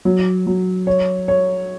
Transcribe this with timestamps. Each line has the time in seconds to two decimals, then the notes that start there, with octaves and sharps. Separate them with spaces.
0.05 F#3
0.47 F#3
0.87 C#5
1.28 C#5